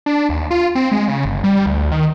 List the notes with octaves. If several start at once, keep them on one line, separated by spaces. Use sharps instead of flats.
D4
D#2
F4
C4
G#3
C#3
G1
G3
D2
D#3